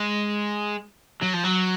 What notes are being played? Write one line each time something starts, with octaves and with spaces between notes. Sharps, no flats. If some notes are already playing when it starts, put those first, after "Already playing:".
Already playing: G#3
F#3
F3
F#3